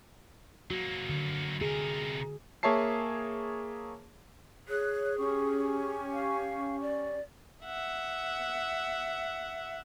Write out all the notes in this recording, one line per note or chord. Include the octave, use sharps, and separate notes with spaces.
F#3 A#3 F#4
D3
C3 G#4 A#4
A#3 G#4 C#5 E5 A5 C7
G#4 C#5 F#6
C#4 G4 C#6
F5
D5
E5 F#5